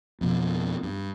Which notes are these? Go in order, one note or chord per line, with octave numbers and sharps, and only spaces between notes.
F2 B2
G2